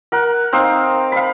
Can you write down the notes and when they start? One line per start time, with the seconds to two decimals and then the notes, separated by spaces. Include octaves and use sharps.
0.12 A#4 F#5
0.53 C4 D#4 F5
1.12 F5 B5